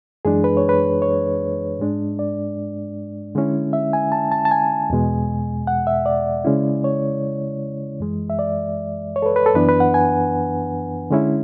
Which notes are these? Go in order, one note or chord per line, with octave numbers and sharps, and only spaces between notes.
F#2 E3 G#3 D4 G#4
B4
C#5
B4
C#5
G#2 G#3 D4
D5
D3 G#3 C#4 E4
E5
G#5
A5
A5
A5
G#5
E2 B2 G#3
F#5
E5
D5
C#3 G#3 C#4 E4
C#5
F#2 E3 G#3
E5
D5
C#5
A4
B4
B4
A4
F#2 E3 B3 D4 B4
B4
F#5
G#5
D3 G#3 C#4 E4